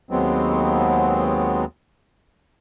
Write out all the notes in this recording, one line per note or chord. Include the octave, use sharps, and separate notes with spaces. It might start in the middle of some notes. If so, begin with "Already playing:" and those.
D#2 F#3 G#3 B3 C4